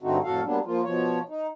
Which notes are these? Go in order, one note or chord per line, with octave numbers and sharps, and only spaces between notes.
G2 D3 A3 C4 D#4 F#4
F2 A2 F#3 F#4 A4 F5
F#3 G3 A#3 B3 D4
F3 A#3 F4
B2 F3 C#5
D#4